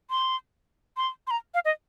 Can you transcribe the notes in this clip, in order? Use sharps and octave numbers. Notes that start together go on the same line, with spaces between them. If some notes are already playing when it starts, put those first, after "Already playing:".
C6
C6
C6
A#5
F5
D#5